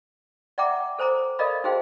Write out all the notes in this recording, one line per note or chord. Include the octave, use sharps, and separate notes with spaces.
D5 E5 F#5 G5 A#5 D6
A4 C5 G#5 A#5 D6
A4 A#4 D5 D#5 F5 B5
D#4 F#4 G#4 C5 F5 G5